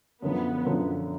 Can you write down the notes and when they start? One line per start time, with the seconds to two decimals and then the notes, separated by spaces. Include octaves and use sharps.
0.22 F#2 D3 F3 B3
0.65 F#2 D3 F3